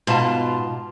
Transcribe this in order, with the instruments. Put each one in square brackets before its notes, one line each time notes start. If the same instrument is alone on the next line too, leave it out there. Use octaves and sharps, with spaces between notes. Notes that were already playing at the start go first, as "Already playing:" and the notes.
[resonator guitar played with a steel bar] G#2 F4 A5 [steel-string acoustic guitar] B2